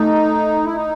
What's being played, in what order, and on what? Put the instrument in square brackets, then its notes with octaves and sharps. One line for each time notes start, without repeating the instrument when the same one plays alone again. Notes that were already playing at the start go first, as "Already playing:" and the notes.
Already playing: [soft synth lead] A3 [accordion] D#4
[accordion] E4
D#4